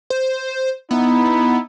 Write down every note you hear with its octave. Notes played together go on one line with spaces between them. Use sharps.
C5
B3 D#4 E4